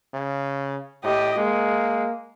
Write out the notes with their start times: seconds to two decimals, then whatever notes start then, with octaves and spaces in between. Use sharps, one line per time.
0.14 C#3
1.04 A2 G4 D#5
1.38 G#3 A#3